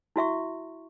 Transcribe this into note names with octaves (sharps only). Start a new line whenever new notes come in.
E4 F#4 E5 C#6